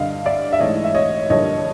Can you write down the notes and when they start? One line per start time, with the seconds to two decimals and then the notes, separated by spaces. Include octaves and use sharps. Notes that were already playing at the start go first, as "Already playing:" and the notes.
Already playing: G2 D3 G3 D#5 F5
0.25 D5 E5
0.53 E5
0.60 G#2 E3 A3 C#5 D#5
0.84 E5
0.94 C#5 D#5
1.29 G2 D3 F3 A#3 C#5 D#5